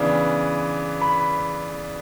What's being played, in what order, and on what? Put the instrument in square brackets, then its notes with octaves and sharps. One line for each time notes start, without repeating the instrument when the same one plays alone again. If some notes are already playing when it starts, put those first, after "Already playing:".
Already playing: [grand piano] C#3 E3 B3 D4
B5